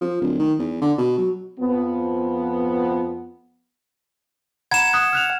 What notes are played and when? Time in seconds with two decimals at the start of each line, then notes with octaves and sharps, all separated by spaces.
0.01 F3
0.21 D1
0.39 D#3
0.59 E2
0.82 D3
0.98 B2
1.18 F#3
1.60 F2 F3 B3
4.71 F#5 A#5 B5 G#6 E7
4.93 D#6 F#6
5.13 F6 F#6 F7